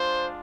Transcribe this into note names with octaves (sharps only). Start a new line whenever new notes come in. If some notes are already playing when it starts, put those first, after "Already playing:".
Already playing: G#3 D4 F4 C5